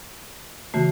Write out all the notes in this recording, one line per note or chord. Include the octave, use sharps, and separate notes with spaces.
C#3 E3 A3 F#4